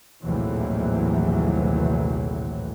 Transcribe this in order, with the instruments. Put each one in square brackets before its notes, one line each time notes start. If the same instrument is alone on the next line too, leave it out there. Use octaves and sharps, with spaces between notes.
[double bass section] A#1 D#2 A2 C3 E3 F#3